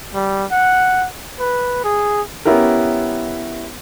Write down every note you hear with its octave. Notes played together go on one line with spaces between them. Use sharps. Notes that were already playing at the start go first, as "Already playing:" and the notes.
G3
F#5
B4
G#4
B3 C#4 E4 G4 A#4